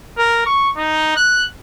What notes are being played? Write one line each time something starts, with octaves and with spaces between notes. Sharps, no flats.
A#4
C#6
D#4
F#6